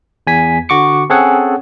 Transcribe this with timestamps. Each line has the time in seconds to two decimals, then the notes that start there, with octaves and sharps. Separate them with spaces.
0.27 E2 G#5 B6
0.69 D3 F#4 C#6 D6 C#7
1.10 C4 C#4 G#4 A4 C#5 F#5